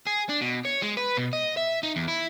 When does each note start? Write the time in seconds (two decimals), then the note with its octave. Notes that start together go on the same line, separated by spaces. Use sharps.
0.07 G#4
0.29 D4
0.41 B2
0.65 C#5
0.82 G#3
0.97 B4
1.17 B2
1.33 D#5
1.57 E5
1.83 D#4
1.96 E2
2.08 E4